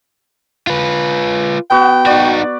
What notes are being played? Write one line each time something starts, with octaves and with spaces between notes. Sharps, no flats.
F4 B4
B3 F#4 G5
D#4 F#4 D5